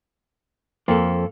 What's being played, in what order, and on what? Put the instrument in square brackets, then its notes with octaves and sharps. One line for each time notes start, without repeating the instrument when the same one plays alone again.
[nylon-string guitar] F2 [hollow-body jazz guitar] A#3 A4